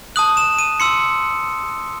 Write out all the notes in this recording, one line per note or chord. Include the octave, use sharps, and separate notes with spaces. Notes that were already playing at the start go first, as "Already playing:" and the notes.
A5 D#6 F#6 F#7
E7
D#7
C6 E6 C#7